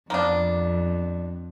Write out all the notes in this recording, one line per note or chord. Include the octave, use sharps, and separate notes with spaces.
F2 A#3 B3 D4